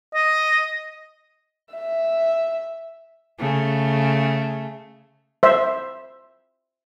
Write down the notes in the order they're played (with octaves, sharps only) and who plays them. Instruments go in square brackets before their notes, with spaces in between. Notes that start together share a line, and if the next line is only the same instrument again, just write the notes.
[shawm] D#5
[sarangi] E5
[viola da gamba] C#3 A3
[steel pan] C5 E5